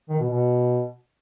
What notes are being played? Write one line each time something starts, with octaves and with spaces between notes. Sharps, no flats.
D#3
B2
B2